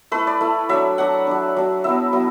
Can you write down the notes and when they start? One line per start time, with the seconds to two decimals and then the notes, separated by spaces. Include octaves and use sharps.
0.11 A3 E4 B4
0.27 D5
0.41 A3 E4
0.69 F#3 D4 E5
0.98 F#3 D4 F#5
1.27 F#3 D4
1.56 F#3 D4
1.84 F#3 B3 E4 E5
2.13 F#3 B3 E4